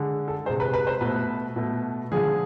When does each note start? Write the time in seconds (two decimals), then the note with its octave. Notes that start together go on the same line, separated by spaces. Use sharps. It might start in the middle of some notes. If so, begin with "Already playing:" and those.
Already playing: D3 G#3
0.28 A4
0.45 G#3 C5
0.50 C3
0.60 B4
0.74 B4
0.87 C5
1.01 B2 A3 B4
1.56 B2 A3
2.12 D3 F3 G#3 G#4